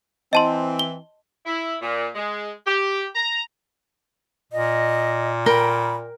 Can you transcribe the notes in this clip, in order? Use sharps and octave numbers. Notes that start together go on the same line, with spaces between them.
E3 C4 D#5 A5 C6
G7
E4
A#2
G#3
G4
A#5
A#2 D#5
A#4 G5 B5